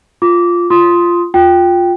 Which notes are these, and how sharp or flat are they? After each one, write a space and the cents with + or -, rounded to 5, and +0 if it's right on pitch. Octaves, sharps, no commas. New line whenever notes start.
F4 +0 D6 -15
F4 -10 C6 +0 D#6 +10
F4 +15 G5 +0